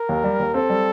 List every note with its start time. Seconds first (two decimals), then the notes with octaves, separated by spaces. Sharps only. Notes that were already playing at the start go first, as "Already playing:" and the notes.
Already playing: A#4
0.09 D#2
0.24 G3
0.39 D#2
0.54 C4 A4
0.70 G3